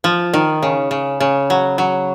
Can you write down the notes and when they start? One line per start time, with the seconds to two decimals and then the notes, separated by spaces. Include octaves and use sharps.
0.04 F3
0.34 D#3
0.62 C#3
0.91 C#3
1.20 C#3
1.50 F#3
1.78 F#3